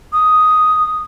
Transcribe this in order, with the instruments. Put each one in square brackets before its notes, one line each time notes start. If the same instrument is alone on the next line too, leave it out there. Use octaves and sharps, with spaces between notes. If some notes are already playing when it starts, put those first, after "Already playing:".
[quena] D#6